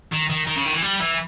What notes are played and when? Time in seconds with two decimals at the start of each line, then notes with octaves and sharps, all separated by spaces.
0.13 D#3
0.30 D#3
0.47 D#3
0.56 C#3
0.65 D#3
0.73 E3
0.82 G3
1.00 E3